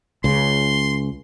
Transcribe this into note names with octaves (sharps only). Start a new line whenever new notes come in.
C#2 C#3 C6